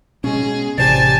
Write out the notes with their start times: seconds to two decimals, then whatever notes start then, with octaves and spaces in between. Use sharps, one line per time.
0.24 B2 G#3 C#4 G#4
0.78 A1 C3 G4 C5 D5 G#5 A5 A6